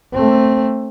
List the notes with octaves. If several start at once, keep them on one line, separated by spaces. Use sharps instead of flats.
A3 C4